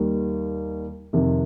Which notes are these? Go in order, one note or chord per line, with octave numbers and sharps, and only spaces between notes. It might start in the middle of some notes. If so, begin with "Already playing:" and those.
Already playing: D#2 D#3 G3
F2 C3 D#3